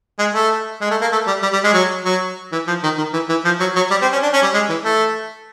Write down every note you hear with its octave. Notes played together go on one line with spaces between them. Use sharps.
G#3
A3
G#3
A3
A#3
A3
G3
G3
G3
G#3
F#3
F#3
E3
F3
D#3
D#3
E3
E3
F3
F#3
F#3
G3
C4
C#4
D4
C#4
G3
G#3
E3
A3